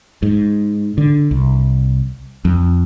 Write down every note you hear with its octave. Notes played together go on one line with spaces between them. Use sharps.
G#2
D3
C2
F2